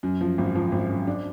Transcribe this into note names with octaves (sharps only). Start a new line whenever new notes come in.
F#2
F3
G#1
F3
G#1
F#2
D4